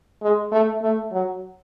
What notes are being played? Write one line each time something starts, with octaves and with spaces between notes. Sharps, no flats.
G#3
A3
A3
F#3